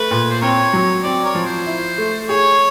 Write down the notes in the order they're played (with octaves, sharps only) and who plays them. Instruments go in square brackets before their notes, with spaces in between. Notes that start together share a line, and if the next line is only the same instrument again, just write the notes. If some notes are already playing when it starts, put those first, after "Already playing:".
Already playing: [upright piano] A3 [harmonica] B4
[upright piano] A#2
[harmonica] C5
[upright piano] C4 [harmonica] A#4 C#5
[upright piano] F#3
[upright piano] C4 [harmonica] D5
[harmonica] A#4 C#5
[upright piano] F3
[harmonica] C5
[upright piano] E4
A3
[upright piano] G#4 [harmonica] C#5